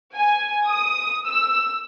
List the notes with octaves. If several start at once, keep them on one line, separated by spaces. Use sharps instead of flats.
G#5
D#6
E6